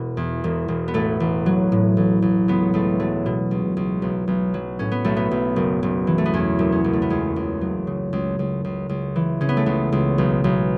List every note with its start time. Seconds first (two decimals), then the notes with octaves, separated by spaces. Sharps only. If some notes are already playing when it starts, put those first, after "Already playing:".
Already playing: E1 B2 F#4
0.17 E2
0.44 E1
0.68 E1
0.88 B3
0.94 A1 A3
1.20 A1
1.46 F#3
1.72 A2
1.97 A1
2.22 A1
2.48 C#2 B3
2.74 C#2 A3
3.00 F#3 A3
3.26 B2
3.51 C#2
3.77 C#2
4.02 B1
4.27 B1
4.54 F#3
4.79 A2 C#4
4.91 B3
5.04 B1 A3
5.16 B3
5.31 B1
5.56 F#1
5.83 F#1
6.07 E3
6.18 A3
6.25 B3
6.33 E2 C#4
6.59 F#1
6.72 C#4
6.84 F#1
6.93 A3
7.02 B3
7.10 C#2 C#4
7.36 C#2
7.61 F#3
7.87 C#3
8.13 C#2
8.39 C#2
8.64 C#2
8.89 C#2
9.16 E3
9.41 C#3 C#4
9.49 B3
9.57 A3
9.66 C#2 B3
9.92 C#2
10.18 B1
10.44 B1